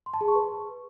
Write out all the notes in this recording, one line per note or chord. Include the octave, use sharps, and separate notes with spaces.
C6
A5
G#4
C#6
B4